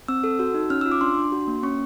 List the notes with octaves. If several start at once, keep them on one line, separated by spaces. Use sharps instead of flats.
C4 E6
A4
F#4
D#4
C#4 F6
F4 E6
D6
D4 C6
D4
F#4
A#3
C#4 C#6